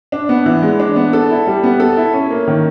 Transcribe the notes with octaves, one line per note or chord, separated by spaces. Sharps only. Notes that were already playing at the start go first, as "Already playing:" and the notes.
D4
B3
E3
G#3
D4
B3
A4
E4
G3
B3
A4
E4
C#4
A#3
D#3